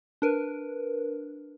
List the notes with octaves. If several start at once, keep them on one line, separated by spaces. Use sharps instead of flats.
D4 A#4 B4